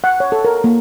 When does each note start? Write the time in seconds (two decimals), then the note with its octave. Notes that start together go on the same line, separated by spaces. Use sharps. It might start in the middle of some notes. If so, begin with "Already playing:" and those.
0.04 F#5
0.20 C#5
0.32 A4
0.45 A#4
0.64 A#3